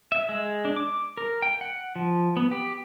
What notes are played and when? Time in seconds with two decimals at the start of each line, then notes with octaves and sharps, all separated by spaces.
0.12 E5
0.29 G#3
0.65 D4
0.76 D6
1.17 A#4
1.42 G5
1.61 F#5
1.96 F3
2.37 B3
2.51 G4